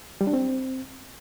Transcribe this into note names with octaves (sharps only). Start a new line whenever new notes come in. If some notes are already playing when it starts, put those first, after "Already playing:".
G3
D4
C4